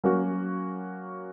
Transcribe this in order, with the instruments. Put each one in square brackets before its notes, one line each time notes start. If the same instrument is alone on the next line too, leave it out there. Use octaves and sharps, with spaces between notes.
[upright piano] F#3 A#3 C#4 F#4 A#4